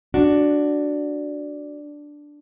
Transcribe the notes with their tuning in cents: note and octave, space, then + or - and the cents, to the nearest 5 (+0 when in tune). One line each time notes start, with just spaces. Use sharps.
D4 +0 F#4 +0